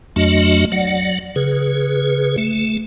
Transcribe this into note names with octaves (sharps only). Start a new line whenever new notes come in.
F2 F#3 A3 D4 F#4 D#5
F#3 D5 F#5
C#3 G#4 B4
A3